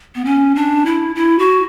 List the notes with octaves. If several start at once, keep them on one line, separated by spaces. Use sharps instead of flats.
B3
C#4
D4
E4
E4
F#4